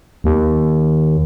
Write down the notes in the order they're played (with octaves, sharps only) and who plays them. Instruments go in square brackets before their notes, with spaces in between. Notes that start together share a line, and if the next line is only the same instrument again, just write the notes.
[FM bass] D#2